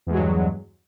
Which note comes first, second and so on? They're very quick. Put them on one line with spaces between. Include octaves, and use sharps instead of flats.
E2 G#3 F#3 G2